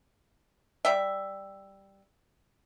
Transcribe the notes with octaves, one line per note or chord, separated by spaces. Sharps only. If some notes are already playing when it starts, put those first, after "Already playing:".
G3 E5